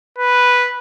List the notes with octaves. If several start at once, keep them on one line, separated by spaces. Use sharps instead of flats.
B4